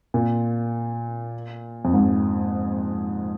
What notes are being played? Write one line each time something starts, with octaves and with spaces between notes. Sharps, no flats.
A#2
F2
G#2